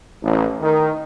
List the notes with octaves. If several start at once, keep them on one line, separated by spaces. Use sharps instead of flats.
A1
D#3